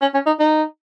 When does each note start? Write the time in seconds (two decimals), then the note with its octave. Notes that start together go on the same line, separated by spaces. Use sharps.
0.01 C#4
0.14 C#4
0.26 D#4
0.40 D#4